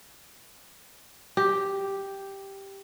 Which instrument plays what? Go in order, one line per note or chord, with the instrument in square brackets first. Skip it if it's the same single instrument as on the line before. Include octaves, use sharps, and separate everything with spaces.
[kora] G4